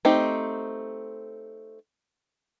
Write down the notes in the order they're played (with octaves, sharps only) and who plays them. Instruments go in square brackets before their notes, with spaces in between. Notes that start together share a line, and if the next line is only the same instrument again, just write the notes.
[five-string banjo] A3 C4 D#4 G4